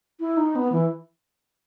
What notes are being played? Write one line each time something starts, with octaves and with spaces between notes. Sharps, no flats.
E4
D#4
B3
E3